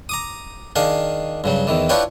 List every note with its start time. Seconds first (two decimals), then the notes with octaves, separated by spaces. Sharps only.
0.09 A#5 D6 D#6
0.76 D#3 D4 G#4 F5
1.44 G2 C#3 F#3
1.67 E2 D#3 E3
1.89 D4 E4 F4 B4 C#5 G5